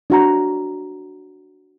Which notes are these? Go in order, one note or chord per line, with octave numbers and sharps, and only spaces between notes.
D4 F#4 A#5